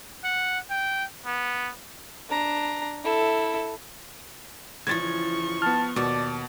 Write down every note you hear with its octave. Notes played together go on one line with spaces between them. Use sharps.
F#5
G5
B3
D4 A#5
E4 A4
E2 C#3 E3 F3 C#6 G#6 A6
B3 A5 F6
D#2 B2 D5 A5